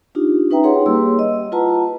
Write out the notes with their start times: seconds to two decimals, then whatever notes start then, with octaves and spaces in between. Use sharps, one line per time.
0.15 D4 D#4 F4 G4
0.50 C#4 D#4 B4 E5 G5 A#5
0.64 G#4 B4 C#5 F#5 C6
0.86 G3 A#3 G4 G#4 C6 E6
1.19 D#5
1.52 E4 F4 B4 F#5 A5 A#5